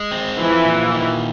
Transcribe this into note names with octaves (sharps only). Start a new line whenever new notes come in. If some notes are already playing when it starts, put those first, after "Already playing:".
Already playing: G#3
C4
E3 F3
A#2
D#3